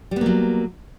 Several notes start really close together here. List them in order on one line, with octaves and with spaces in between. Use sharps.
G3 B3 A#3 F#3